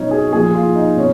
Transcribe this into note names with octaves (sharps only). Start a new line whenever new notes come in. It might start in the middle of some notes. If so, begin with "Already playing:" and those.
Already playing: B2 F#3 C#4 D#4
G#4
A#2 F3 G#4
F4
D#4
B2 C#4